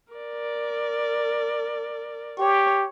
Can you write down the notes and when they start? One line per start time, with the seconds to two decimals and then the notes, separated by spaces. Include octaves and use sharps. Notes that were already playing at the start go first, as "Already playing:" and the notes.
0.12 A#4 D5
2.39 G4 C#5